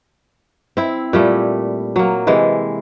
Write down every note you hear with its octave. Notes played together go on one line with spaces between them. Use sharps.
C4 E4
A#2 G3 A3
F#3 A#3
C3 E3 G#3